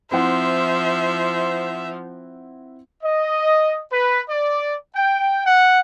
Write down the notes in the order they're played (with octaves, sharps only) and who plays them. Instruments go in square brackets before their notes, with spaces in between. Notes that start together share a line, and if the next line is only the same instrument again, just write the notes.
[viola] F3 [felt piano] C4 E4 F#5 [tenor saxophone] C5 [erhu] E5
[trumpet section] D#5
B4
D5
G5
F#5